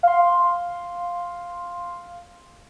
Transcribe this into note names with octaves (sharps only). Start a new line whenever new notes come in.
F5 C6